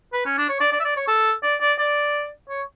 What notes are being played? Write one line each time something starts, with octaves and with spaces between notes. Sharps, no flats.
B4
C#4
D4
C#5
D5
D5
E5
D5
C#5
A4
D5
D5
D5
C#5